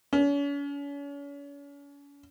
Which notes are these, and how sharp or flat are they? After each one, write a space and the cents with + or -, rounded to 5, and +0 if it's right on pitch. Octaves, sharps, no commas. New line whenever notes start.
C#4 +40